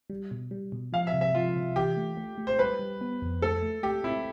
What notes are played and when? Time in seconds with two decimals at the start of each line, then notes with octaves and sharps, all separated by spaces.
0.10 G3
0.31 B2
0.51 G3
0.72 B2
0.93 F3 F5
1.07 E5
1.13 C3
1.21 E5
1.34 F3 F4
1.56 C3
1.76 E3 G4
1.97 A3
2.17 A3
2.38 A3
2.47 C5
2.59 G3 B4
2.79 G3
3.01 B3
3.22 F2
3.42 A3 A4
3.63 A3
3.83 A3 G4
4.04 C4 E4